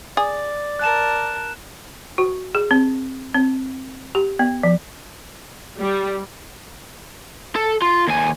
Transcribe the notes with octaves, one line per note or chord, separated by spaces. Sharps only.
G#4 D5
A#4 A5 F#6 E7
F#4
G#4
C4
C4
G4
B3
F3
G3
A4
F4
D#2 G#5